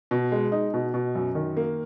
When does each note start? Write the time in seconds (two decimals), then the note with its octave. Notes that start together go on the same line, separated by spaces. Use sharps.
0.11 B2
0.32 G#3
0.52 D#4
0.74 B2
0.94 B2
1.15 F#2
1.35 D#3
1.57 A#3